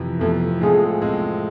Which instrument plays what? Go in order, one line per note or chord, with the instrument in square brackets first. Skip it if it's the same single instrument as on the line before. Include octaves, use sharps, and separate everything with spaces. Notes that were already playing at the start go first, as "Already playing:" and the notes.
Already playing: [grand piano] F2 C3 E3
[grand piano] F2 C3 E3 [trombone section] A3
[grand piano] A2 G#3 C4 F4 A4 [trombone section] G#4
[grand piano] A2 G#3 C4 F4 A4